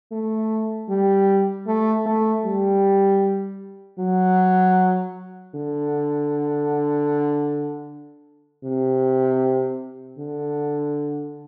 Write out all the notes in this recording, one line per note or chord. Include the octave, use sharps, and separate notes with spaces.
A3
G3
A3
A3
G3
F#3
D3
C3
D3